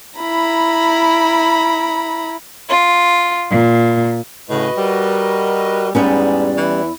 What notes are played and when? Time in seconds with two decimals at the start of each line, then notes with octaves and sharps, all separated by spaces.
0.19 E4 A#5 B5
2.70 F4
3.51 A#2
4.50 A2 C#3 F#4 B4 D#5
4.77 G3 A#4
5.95 E2 G#2 G3 B3 C#4 D5
6.57 E3 E4